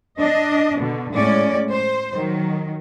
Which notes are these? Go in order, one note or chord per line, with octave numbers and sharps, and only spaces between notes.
D4 D#5
B2 D3
A2 G#3 C#4 D5
C5
D#3 F#3